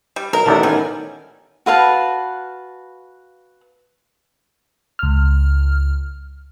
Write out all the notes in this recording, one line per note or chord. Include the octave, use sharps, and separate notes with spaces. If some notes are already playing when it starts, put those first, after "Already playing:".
G3
B1 A#4
A1 D#3 C4 D5 E5 F#5 A5
G3 B3 C#4 A#4 G#5
F#4 B4 F5 A5
C#2 F6